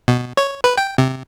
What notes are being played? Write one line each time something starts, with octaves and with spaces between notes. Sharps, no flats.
B2
C#5
B4
G5
C3